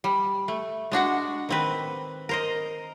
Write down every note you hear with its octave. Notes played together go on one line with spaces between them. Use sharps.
G3
A3
G#3 D4 F#4 F#5
D#3 C4 B4
A#4 C5 D#5